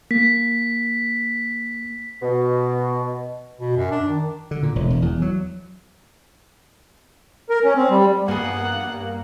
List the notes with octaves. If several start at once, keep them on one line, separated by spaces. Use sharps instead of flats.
A#3 B6
B2
B2
F#2
D4
D#3
D3
A#2
E1
E1
E2
F#3
A#4
C#4
C4
G3
G2 A#3 B3 G#4 F#5